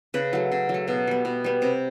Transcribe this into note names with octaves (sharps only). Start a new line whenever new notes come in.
C#3 B4
F#3 A3
C#3
F#3
A3
B2
G3 B3
B2
G3 B3
C3